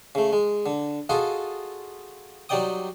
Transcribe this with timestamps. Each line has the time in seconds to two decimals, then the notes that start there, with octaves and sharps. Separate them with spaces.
0.15 C#3 A3
0.33 G#3
0.66 D3
1.09 F4 F#4 G#4 A4 D#5 F5
2.49 F#3 G3 D#4 D5 G5 D#6